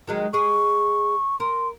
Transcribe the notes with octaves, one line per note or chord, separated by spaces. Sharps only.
D#3 F#3 G#3
G#3 G#4 C#6
A#4 C6